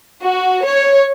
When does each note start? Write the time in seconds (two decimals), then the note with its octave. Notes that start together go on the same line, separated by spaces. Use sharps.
0.22 F#4
0.64 C#5